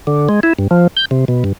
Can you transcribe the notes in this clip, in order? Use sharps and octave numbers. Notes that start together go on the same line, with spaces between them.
D3
G#3
E4
G2
F3
G6
C3
B2
G2